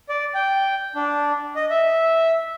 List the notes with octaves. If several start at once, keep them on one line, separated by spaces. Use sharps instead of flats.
D5
G5
D4
D#5
E5